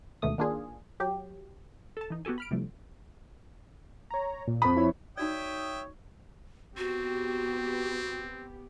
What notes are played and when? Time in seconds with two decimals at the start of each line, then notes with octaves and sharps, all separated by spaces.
0.22 D2 G#2 B2 D#3 A3 D#6
0.38 D#3 A#3 D4 F4 G#4
1.00 F#3 G4
1.97 A4 A5
2.10 E3 D#4
2.25 B3 F#4 G4 A4 G#5
2.38 B5 F6 D7
2.51 C3 E3 F3 G3 A3
4.10 C#5 A#5
4.48 A#2
4.62 F2 B5 D#6
4.76 F3 E4 C#5
5.17 D#4 F#4 C#5 D5 E5 G5 D#6
6.78 B3 C4 F#4 G4